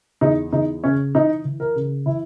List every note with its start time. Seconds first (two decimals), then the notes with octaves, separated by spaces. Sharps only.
0.21 E2 D#4
0.52 E2 D#4
0.83 C#3 C#4
1.15 E3 D#4
1.45 E3
1.60 A#4
1.75 C#3
2.06 E3 E4